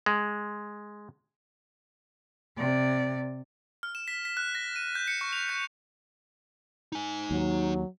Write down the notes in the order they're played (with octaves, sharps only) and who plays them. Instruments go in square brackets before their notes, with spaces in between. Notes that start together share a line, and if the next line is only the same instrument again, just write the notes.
[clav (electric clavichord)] G#3
[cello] C3 D5
[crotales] F6
E7
B6
B6
F#6
A#6
D#7
G6
C#7
C#6
F7
G6
[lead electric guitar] D#4 G#5
[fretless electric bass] D#2 [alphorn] F#3